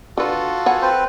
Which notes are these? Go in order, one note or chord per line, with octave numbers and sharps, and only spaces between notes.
D3 F4 F#4 A4 B4
B3 C#5 F#5 G#5
C4 B4 C5